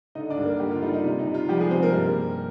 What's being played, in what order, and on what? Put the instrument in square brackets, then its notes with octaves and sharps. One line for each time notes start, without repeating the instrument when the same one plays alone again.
[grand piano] D3 D#4 D#5
D4 D5
G2
A#3 A#4
D3 G3 G4
F4
G3 D#4
D#4
C3 F4
D#4
C3
F4
F3 G3 G4
G#3 G#4
C3 C4 C5
A#3 A#4
G2
A#3